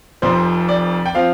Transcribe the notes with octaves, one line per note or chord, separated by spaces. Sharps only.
F1 F2 F3 C4 C5
D5
G5
F3 C4 F5